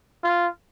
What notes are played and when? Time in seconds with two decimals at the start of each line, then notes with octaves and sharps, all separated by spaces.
0.24 F4